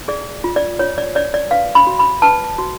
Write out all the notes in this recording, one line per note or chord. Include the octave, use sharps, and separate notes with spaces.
G#4 D5
F4
D5
F4 C#5
D5
C#5 D5
D5
B4 F5
B5
F#4
B5
B4 A5
F#4